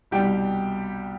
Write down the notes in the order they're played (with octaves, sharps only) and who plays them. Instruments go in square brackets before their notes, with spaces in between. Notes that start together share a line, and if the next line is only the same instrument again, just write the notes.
[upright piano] C2 B2 G3 G4 G5